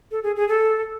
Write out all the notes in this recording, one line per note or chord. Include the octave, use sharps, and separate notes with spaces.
A4
G#4
G#4
A4